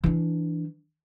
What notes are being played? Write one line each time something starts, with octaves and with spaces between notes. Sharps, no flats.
E3 D4